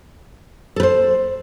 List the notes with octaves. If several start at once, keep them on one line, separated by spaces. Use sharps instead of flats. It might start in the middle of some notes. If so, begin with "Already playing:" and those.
A4 B4 C5